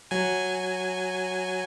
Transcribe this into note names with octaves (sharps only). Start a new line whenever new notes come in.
F#3 G#5